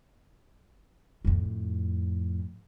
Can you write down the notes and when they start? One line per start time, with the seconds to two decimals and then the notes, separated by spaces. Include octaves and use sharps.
1.25 F2 A2